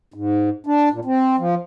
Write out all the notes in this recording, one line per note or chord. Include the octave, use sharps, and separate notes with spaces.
G#2
D4
A#2
C4
F3